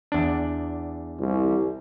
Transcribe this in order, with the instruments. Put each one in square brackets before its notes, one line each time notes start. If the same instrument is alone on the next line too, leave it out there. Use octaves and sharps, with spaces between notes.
[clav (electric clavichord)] E2 D4
[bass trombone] C2